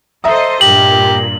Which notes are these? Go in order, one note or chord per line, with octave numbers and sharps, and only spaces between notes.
A4 C5 D#5 E5 A#5 D#6
G2 A#2 G4 F#7